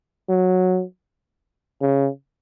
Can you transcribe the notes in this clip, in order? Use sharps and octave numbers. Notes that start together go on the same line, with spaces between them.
F#3
C#3